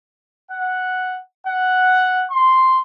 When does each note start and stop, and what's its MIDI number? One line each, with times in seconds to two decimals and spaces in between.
0.52 1.20 78
1.46 2.25 78
2.31 2.81 84